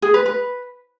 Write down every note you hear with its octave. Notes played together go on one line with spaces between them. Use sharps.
G#4
B4
B4